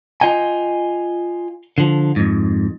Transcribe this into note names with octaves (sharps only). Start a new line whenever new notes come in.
F4 D#5 G5 G#5
D3 F3
F2 G#2